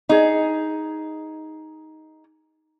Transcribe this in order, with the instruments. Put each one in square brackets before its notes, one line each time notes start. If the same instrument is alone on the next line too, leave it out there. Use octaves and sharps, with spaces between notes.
[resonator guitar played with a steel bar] D#4 G#4